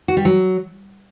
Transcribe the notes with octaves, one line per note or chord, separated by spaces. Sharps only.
F#4
G3
F#3